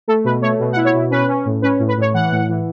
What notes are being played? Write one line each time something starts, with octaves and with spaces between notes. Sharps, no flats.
A3 A4
B2 B4
A3 C#5
B2
F#5
E4
C#5
B2
C#4 B4
C#4
A2
C#4 B4
A2
B4
A2 C#5
E3 F#5
A2
E3